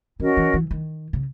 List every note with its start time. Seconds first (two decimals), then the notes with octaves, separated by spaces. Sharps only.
0.20 E3 C#4 F#4 A#4 D#5
0.37 E3
0.54 E3
0.71 D#3
1.13 C#3